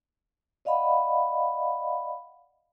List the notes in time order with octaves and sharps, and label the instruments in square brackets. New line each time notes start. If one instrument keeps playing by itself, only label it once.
[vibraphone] D5 D#5 F5 F#5 B5